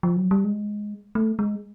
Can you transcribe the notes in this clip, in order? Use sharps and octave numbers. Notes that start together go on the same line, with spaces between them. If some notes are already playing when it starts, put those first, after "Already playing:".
F3
F#3
G3
G#3
A3
G#3